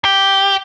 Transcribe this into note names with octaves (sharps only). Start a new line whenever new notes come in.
G4